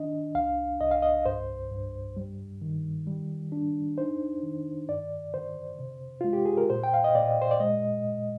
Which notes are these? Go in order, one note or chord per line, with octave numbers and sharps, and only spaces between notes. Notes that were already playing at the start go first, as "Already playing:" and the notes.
Already playing: D#3 D4 D#5
C2 F5
C2 D#5
F5
D#5
G2 C5
G2
G3
D#3
G3
D4
D#4 C5
D#3
G2 D5
D3 C5
C3
G#3 F4
G4
G#4
A#4
A#2 C5
G5
F5
D#5
A#2 D5
C5
D5
G#3 D#5